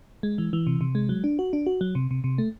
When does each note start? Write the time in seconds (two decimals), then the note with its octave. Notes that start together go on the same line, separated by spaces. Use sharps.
0.23 G#3
0.38 E3
0.53 E3
0.67 C3
0.81 C3
0.95 G#3
1.09 F#3
1.24 D4
1.39 F#4
1.53 D4
1.66 F#4
1.81 F#3
1.95 C3
2.11 C3
2.24 C3
2.38 A3